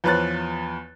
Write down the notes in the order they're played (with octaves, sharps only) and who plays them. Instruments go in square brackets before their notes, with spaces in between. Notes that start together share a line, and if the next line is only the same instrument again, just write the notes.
[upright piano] E2 F3 B4 C#5 F#6 A6